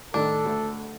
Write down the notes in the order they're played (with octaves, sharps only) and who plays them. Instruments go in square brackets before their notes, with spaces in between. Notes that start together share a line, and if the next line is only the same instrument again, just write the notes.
[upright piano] A2 D#3 [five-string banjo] D4 [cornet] A4
[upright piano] D2 A3